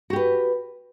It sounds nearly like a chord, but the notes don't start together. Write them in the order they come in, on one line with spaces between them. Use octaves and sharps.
F#4 G4 B4